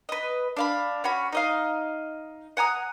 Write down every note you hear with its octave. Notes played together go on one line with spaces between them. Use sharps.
B4 D#5
D4 F5 B5
C#4 F#4 B5
D#4 D#5 F5
F#5 G#5 A#5 D#6